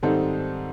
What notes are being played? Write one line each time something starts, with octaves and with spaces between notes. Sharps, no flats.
G#2 D#3 G3 C4 D#4 A4